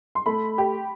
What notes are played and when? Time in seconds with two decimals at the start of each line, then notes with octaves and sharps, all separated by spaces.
0.15 C6
0.26 A3 B5
0.58 G4